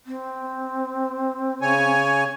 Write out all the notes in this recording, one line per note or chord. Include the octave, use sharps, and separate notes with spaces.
C4
C#3 C#5 G#5